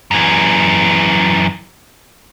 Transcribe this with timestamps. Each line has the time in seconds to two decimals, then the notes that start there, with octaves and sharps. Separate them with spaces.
0.11 F#2 E3